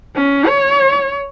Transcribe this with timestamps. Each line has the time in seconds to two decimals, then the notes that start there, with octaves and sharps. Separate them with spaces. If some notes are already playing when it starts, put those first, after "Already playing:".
0.16 C#4
0.47 C#5